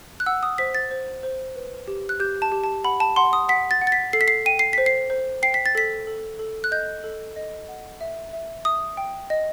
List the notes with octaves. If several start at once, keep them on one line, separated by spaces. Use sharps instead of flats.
F#6
F#5 E6
D#6
C5 B6
A6
C5
C5
B4
G4
F#6
G4 G6
A5
G4
A5
F#5 B5
A5
F#5 C6
D#6
F#5 B6
A6
F#5
A6
B6
A4 C7
B6
C7
G5 D#7
C7
C5 B6
C7
C5
G5 C7
B6
A6
A4 B6
A4
A4
F#6
D#5 G6
A4
D#5
F#5
E5
E5
E5 D#6
G5
D#5